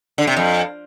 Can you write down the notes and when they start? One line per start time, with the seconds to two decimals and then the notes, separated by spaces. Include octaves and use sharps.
0.18 D3
0.27 C3
0.37 F2